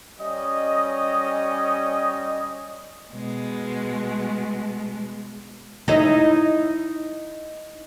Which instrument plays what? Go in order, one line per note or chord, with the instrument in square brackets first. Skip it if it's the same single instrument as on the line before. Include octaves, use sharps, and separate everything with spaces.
[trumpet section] G3 C#4 D#5
[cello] B2 G#3
[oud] D#4 E4 D#5